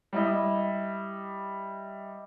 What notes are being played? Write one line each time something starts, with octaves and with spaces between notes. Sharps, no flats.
G3 E4 D#5